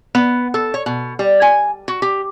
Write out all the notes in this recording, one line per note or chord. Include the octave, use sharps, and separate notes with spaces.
B3
A4
C#5
B2
G3
G#5
F#4
G4